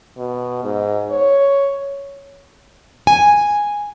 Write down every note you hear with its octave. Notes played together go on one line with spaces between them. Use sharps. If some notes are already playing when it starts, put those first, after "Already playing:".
B2
G#2
C#5
G#5